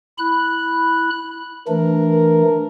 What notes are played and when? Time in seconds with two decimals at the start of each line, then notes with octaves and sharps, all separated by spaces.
0.18 E4 B5 F#6
1.68 E3 A3 D4 A#4